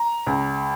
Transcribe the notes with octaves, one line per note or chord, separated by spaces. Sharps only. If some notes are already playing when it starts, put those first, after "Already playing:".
Already playing: A#5
C#2